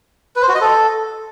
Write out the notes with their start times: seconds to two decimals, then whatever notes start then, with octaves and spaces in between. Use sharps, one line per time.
0.36 B4
0.42 C5
0.48 F#4
0.55 D#5
0.61 A4